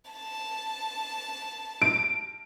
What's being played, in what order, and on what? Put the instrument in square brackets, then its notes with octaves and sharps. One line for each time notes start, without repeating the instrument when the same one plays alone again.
[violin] A5
[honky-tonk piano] D7